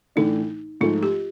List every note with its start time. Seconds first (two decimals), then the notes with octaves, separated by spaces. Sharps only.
0.16 A2 E3 A3 D4 D#4
0.81 G#2 F3 A3 F4
1.03 G4